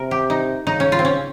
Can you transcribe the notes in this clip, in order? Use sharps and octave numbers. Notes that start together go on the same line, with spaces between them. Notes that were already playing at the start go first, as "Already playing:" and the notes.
Already playing: C3 A#4
G4
D#4
C#3 D#4
C#4
F4
C4
C#4